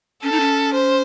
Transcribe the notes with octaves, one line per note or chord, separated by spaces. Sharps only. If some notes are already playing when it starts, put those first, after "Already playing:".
C#4 A4
D#4
C#4
C5